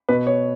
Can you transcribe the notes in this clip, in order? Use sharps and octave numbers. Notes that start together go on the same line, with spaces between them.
B2 B4
C#5